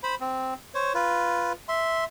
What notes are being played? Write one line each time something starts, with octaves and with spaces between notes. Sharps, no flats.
C5 B5
C4
C5 C#5
F4 B4
E5 C6